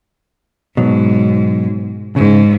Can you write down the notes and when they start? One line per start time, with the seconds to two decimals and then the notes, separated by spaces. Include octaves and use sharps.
0.77 G#2 B2 F#3
2.16 G#2 C#3